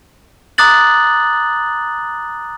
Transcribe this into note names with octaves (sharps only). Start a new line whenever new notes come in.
A#5 D6 D#6 F#6 A6 F#7